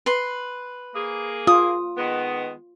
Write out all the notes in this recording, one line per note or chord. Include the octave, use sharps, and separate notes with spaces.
B4 C6
A#3 G#4
F4 D#6
D#3 G#3 B3